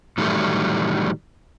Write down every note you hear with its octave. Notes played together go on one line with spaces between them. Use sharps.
A2 D#3 E3 F#3 G3 A3